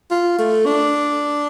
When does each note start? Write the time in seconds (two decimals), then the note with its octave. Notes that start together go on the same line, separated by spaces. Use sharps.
0.11 F4
0.39 A3
0.66 D4